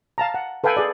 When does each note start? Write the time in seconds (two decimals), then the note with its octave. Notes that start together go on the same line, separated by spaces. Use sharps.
0.18 F5 A5 A#5
0.34 F#5
0.64 A4 B4 F5 G5 G#5
0.77 G#4 D5